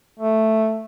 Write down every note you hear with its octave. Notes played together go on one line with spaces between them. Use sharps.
A3